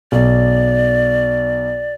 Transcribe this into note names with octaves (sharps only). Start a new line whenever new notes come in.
B1 D5